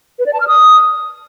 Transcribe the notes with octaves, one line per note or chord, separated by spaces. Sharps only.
B4
D5
A5
F6
D#6